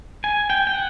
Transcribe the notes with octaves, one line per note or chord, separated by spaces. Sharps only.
G#5
G5
G5
F#5